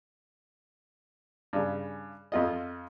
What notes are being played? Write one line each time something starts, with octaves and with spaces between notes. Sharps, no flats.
G2 C#3
F2 F4 D#5